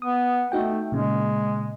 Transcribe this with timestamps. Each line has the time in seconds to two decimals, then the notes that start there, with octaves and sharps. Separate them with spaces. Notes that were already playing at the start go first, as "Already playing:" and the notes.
0.02 B3 D#6
0.52 A3 D#4 F#4 G5
0.92 A#2 C#3 G#3